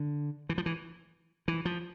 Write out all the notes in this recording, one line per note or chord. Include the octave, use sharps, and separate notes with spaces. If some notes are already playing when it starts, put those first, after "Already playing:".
Already playing: D3
E3
F3
E3
E3
F3